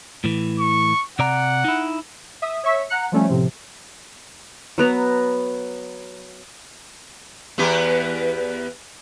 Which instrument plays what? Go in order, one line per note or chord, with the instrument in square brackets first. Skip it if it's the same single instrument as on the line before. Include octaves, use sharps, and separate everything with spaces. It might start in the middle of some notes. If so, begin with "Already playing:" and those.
[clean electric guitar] A2 E3
[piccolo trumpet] C#6
[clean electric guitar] C3 D5 A#5 [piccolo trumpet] F#5
[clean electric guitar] D#4 E4
[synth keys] E5 D#6
C#5 E5 C#6 E6 B6
F#5 A#5 F#6 C#7
F3 G3 A3 C#4
A2 C3 F3
[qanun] F#3 B3 A#5
[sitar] E2 B3 G4